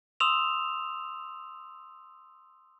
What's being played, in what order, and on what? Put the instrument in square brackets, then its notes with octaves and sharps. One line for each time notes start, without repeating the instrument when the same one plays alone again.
[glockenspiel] C6 D#6 E6 E7 F7